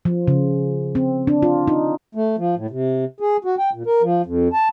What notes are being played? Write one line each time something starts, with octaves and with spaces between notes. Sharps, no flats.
F3
C#3
C4
D4
F4
D#4
A3
F3
A2
C3
G#4
F#4
G5
A#2
A#4
F3
F2
A5